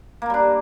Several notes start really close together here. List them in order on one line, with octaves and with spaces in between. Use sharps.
A#3 A#4 G3 D4